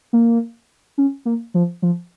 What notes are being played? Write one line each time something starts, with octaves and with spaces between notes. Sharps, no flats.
A#3
C#4
A#3
F3
F3